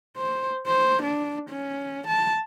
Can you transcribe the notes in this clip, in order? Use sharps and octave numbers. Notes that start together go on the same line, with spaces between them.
C5
C5
D4
C#4
A5